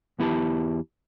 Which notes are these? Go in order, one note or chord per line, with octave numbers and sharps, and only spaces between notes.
E2 B3 E4 G4 A5